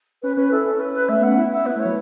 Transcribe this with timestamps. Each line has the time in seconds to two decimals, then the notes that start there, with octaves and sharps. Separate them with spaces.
0.22 C#4 B4
0.37 C#4 B4
0.51 E4 A4
0.65 C#4
0.80 C#4 B4
1.09 A3 E5
1.19 B3
1.23 C#4 F#5
1.38 E4
1.52 E5
1.65 B3 B4
1.76 A3
1.80 C#5
1.85 F#3